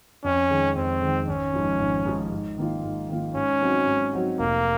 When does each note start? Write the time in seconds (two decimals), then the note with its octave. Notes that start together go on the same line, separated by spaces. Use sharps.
0.24 F2 C#4
0.50 D#3 G#3
0.76 F2 C4
1.02 D#3 G#3
1.28 G#1 C#4
1.54 G#2 F3
1.80 G#1
2.06 G#2 F3
2.31 G#2
2.58 D#3 A#3 F4
2.84 G#2
3.09 D#3 A#3 F4
3.35 G#2 C#4
3.61 F#3 C4 D#4 F#4
3.86 G#2
4.13 F#3 C4 D#4 F#4
4.39 F1 A#3